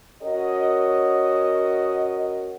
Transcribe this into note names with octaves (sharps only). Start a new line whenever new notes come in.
C#4 F#4 A#4 C#5 D#5